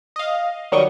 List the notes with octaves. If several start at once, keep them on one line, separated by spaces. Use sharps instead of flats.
D#5 F5
D#3 F#3 G3 D#5 C#6 D7